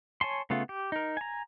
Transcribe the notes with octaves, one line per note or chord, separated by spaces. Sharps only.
C#5 G#5 A5 C6
C#3 A3 B3 F4
G4
D#4 A#4
G#5 A#5